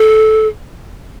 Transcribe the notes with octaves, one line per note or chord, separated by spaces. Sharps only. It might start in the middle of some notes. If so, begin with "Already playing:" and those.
Already playing: A4